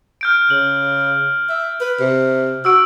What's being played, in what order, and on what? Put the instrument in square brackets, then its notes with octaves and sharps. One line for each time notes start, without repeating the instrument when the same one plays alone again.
[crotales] F6 G6 D7
[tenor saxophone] C#3 [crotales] F#7
[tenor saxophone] E5
B4
C3
[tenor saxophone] F#4 [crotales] E6 D7